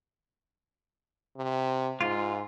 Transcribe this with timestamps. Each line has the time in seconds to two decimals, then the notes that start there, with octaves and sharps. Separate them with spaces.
1.37 C3
2.01 G#2 F4